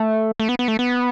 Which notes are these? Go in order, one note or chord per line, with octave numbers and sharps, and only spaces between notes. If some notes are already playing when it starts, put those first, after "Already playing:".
Already playing: A3
A3
B3
B3
A3
B3